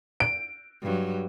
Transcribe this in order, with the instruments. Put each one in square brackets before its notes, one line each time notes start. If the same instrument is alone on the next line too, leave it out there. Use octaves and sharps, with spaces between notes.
[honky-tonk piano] D7
[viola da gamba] G2 F#3